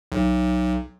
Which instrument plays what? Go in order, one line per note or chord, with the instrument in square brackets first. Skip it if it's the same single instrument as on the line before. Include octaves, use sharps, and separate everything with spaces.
[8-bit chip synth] B1